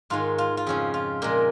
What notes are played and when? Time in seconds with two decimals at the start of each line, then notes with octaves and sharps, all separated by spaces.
0.10 G#2 D#3 G#3 F4
0.38 F4
0.57 F4
0.66 F2 C#3 F3 G#4
0.94 F4
1.22 A#2 G#3 A#4